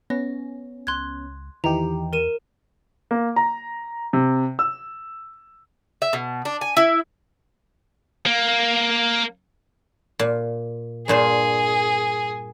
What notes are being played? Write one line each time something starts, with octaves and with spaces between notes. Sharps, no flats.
B3 C#4 A#6
C#2 C6 F#6 G#6
E2 D#3 E3 D#4 G4 A#5
A#4 D#7 E7
A#3
A#5
C3
E6
E5
B2
D4
G#5
E4
A#3
A#2
G2 A#2 G#4 C5